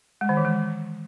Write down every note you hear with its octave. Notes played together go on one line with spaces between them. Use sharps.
G#3
D#3
E3
G#3